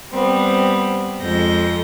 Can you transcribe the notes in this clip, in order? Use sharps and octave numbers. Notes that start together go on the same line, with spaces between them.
G3 B3 C4
F2 F3 G#3 A4 G6 A#6